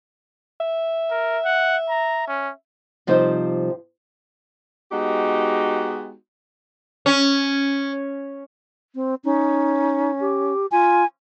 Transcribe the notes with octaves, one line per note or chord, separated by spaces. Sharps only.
E5
A#4
F#5
A#5
C#4
C3 F3 G3 D#4 C5
G#3 B3 D#4 F#4 G4
C#4
C4
C#4 D#4
G4
F4 G#5